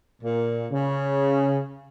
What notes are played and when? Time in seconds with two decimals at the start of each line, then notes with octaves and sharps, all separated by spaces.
0.22 A#2
0.71 C#3